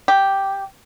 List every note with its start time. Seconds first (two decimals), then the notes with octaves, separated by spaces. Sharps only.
0.08 G4